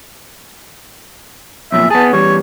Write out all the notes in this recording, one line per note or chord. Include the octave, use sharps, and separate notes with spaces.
B1 F2 A#2 E5
B3 G#4 A5
E2 G3 C#5